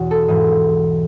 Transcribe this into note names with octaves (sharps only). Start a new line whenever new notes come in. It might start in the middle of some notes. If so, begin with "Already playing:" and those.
Already playing: E2 B2 F#4 C#5
A4
G#2 E3